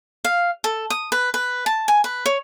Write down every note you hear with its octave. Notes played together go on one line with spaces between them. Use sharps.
F5
A4
D#6
B4
B4
A5
G#5
B4
C#5